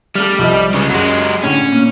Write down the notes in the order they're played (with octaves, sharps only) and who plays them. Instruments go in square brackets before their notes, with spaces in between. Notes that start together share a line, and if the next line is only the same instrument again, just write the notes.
[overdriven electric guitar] G3 [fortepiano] A3 F6
[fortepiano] C2 F3 D#5
[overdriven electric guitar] C#3 G#3
[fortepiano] F#2 [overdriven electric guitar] F#3 G#3
[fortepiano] A2 D3 [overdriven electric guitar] C#4
[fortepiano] A#2